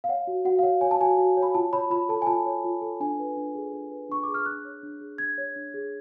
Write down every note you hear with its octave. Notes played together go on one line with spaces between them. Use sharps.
F5
C#5 F#5
F#4
F#4 F#5
F5
C#5 F#5
C#5 G#5
A5
F#4 G#5
F#4
C#5
B5
F4 A5
C#5 B5
F4 B5
A4 A5
G#5
F4 A5
C#5
F4
A4
D4 G#5
B4
D4
G#4
D4
B4
D4 C#6
G#4 D6
F6
D4 F#6
C#5
D4
G#4
D4 G#6
C#5
D4
G#4